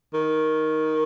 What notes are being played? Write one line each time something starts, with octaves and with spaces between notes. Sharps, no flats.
D#3